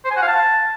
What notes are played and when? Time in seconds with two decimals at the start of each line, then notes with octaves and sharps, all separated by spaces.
0.05 C5
0.11 G#5
0.16 F#5
0.22 F5
0.28 A5